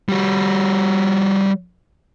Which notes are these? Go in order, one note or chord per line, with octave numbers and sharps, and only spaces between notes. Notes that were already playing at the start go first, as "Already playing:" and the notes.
G3 F#4